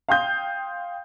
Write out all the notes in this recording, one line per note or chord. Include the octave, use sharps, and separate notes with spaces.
F5 G5 C6 D#6 G6